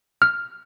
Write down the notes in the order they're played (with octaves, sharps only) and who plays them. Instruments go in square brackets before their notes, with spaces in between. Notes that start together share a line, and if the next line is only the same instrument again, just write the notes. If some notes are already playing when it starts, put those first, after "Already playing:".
[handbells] F6